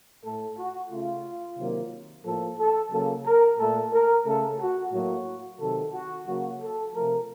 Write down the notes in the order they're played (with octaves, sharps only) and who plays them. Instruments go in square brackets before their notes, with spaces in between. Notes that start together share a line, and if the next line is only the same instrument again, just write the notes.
[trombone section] A2 A3 A4
F#4
C#3 A3 F4
C3 D#3 F#3 A#3
A2 F3 A#3 A4
A4
C#3 F#3 A#3 A4
A#4
A#2 A3 A4
A#4
C#3 A3 A4
F#4
A2 F#3 A#3 F#4
C3 D#3 F#3 A4
F#4
C#3 F#3 A#3 F#4
A4
C3 F3 A3 A#4